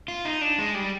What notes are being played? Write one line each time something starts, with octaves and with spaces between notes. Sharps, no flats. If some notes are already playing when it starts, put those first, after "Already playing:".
F4
D#4
D4
G#3
G3